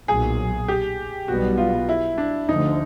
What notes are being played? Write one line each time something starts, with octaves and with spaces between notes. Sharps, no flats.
B1 A#2 F#3 G#4
G4
B1 B2 G3 B3 F#4
F4
E4
D4
D2 D3 F3 D#4